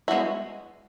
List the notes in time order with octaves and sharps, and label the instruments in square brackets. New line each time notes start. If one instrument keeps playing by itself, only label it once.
[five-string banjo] G#3 B3 E4 F#4